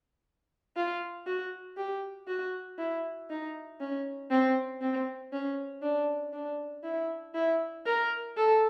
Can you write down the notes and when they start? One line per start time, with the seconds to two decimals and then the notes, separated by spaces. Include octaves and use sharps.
0.76 F4
1.27 F#4
1.77 G4
2.28 F#4
2.78 E4
3.30 D#4
3.80 C#4
4.31 C4
4.81 C4
5.33 C#4
5.83 D4
6.33 D4
6.84 E4
7.35 E4
7.86 A#4
8.37 A4